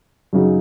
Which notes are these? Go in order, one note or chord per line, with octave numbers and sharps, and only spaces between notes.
F#2 C#3 F#3 D#4